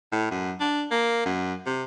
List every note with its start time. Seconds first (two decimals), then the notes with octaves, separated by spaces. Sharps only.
0.12 A2
0.31 F#2
0.60 D4
0.91 A#3
1.25 F#2
1.66 C3